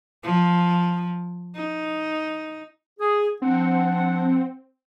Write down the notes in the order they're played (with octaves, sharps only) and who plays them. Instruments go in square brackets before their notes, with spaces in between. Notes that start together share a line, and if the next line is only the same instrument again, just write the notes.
[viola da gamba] F3
D#4
[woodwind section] G#4
[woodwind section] F3 D4 F#5 [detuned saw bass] C4